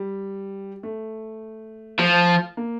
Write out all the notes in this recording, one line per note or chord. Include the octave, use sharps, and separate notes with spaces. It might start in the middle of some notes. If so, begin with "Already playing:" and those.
Already playing: G3
A3
F3
A#3